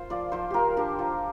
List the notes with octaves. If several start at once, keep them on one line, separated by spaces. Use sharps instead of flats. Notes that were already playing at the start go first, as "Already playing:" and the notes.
Already playing: F4 C5
F3 D5
F3 C5
F4 G4 A#4
D4 G4
F3